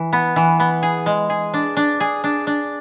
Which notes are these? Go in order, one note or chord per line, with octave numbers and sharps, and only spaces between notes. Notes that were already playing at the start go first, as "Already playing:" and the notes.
Already playing: E3
B3
E3
B3
G#4
G#3
G#4
D4
D4
G#4
D4
D4